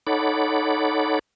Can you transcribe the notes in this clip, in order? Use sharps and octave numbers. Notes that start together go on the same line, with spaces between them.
D#4 A4 C#5 F#5 B5 D6